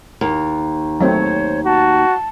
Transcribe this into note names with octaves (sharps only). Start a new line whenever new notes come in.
D#2
F#3 A3 C4 C5 C#5
F#4 A5